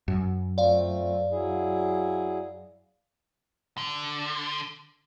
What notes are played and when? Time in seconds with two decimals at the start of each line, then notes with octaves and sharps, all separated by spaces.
0.08 F#2
0.58 A3 C4 F4 D5 F5
1.31 F#3 E4 G#4
3.77 D3